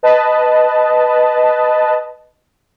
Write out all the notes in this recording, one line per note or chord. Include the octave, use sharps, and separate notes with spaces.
B4 D#5 A5